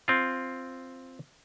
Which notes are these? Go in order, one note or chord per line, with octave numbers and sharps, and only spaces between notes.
C4 F4